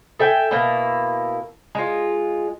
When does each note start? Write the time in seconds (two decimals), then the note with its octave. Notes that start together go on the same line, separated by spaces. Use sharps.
0.19 A4 E5 G5 G#5
0.51 B2 A#3 E4
1.75 G#3 F4